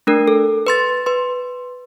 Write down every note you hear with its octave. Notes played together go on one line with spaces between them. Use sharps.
A3 D4 A#4
A4
B4 C6 A6
B4 C6